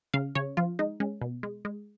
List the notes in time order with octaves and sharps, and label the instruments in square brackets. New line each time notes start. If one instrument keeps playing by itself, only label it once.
[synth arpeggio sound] C#3 F5
C#3 C#5
F3 F4
G#3 D#4
G#3 C#4
B2
G#3
G#3